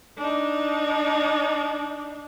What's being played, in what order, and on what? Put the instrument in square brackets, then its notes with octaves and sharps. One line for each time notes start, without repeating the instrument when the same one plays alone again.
[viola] D4 D#4